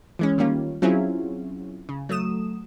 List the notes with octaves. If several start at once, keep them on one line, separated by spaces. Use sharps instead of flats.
E3 G#3 C#4
D#3 G3 A#3 C#4 F4
F#3 C4 C#4 E4 F4 G#4
C#3
F#3 A3 D#6 E7